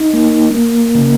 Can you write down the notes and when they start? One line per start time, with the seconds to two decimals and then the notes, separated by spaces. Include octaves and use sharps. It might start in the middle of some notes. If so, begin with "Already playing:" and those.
Already playing: D#4
0.13 A#3
0.54 A#3
0.95 C#3